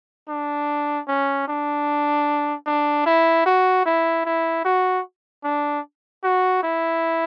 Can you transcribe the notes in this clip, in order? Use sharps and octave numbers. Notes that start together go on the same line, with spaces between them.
D4
C#4
D4
D4
E4
F#4
E4
E4
F#4
D4
F#4
E4